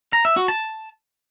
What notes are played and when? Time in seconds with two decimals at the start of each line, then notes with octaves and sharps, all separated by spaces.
0.13 A#5
0.25 E5
0.37 F#4
0.48 A5